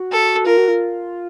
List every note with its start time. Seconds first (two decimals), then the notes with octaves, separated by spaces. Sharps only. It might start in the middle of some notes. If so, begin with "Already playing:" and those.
Already playing: F#4
0.12 A4
0.46 F4 A#4
0.57 F#4
0.68 F4